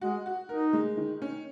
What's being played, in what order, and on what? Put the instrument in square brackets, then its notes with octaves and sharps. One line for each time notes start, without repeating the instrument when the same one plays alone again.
[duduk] G#3 [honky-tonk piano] F#4
[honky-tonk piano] F#4
[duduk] D#4 [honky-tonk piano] A#4
[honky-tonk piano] G#3
D#3
C#4